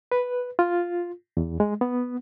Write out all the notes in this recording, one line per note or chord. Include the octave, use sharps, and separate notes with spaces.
B4
F4
E2
G#3
B3